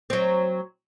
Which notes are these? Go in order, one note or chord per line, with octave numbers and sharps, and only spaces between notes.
F#3 C4